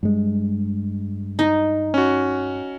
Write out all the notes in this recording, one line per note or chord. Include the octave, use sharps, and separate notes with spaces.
G2 G#3
D#4
C#4 F#4